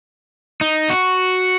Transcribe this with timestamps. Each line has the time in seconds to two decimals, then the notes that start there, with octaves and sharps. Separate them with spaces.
0.61 D#4
0.90 F#4